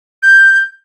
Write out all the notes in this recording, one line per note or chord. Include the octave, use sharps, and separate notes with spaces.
G6